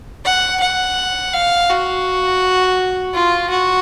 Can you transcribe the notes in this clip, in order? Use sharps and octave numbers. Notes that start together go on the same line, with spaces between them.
F#5
F#5
F5
F#4
F4
F#4